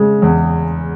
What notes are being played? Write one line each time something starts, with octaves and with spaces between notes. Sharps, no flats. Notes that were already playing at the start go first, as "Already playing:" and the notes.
Already playing: C#3 G#3
E2